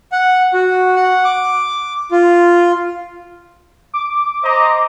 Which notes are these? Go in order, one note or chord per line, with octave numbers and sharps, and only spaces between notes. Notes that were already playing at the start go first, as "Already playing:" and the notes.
F#5
F#4
F#5
D6
F4
D6
C5 D#5 A#5